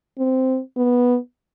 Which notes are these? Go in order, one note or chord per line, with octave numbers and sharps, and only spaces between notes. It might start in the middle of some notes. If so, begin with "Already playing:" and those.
C4
B3